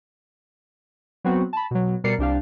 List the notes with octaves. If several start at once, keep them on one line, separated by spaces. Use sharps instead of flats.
F#3 B3 C4 F#4
A5 B5
B2 F#3
B2 G3 A#4 D5 C7 C#7
C2 D4 G4 F5